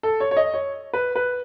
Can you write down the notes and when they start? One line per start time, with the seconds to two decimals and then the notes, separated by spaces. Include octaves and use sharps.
0.03 A4
0.20 C#5
0.31 C#5
0.37 D#5
0.54 C#5
0.94 B4
1.16 B4